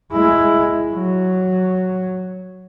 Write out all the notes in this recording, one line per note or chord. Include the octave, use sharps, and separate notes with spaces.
G#3 E4
F#3